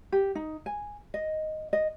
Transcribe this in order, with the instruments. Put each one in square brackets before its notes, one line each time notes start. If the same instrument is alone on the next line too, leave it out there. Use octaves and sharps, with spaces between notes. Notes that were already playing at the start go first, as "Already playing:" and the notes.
[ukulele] G4
D#4
G#5
D#5
D#5